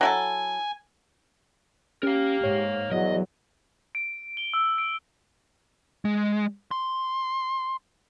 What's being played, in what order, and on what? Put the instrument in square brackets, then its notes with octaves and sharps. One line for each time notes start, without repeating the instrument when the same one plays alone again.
[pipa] F#3 E4 A4 [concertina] G#5
[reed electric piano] C#4 [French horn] G4 [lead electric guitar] A#4 F5
[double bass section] G#2 [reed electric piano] C#5
[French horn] E2 [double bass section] F#3 [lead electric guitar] D#5
[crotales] D7
G7
E6
D7
[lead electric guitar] G#3
C6